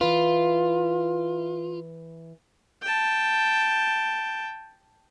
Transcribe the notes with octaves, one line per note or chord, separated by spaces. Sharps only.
E3 F4 B4
G5 A5